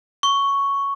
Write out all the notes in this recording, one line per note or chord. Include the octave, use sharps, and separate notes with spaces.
C#6